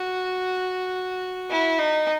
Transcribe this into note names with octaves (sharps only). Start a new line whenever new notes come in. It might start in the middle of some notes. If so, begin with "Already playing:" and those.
Already playing: F#4
E4
D#4